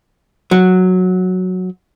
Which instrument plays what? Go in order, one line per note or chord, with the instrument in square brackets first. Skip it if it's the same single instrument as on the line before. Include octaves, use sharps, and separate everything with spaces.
[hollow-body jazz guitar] F#3